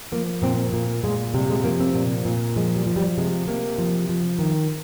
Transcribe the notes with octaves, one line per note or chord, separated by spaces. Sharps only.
F3 A#3
A#2 C4
A#2 A#3
A#2 G#3
C3 G3
G#3
F3 A#3
C4
A#2
A#2
F3 G#3
G3
F3
G3
C3 G#3
C3 A#3
F3
F3
D#3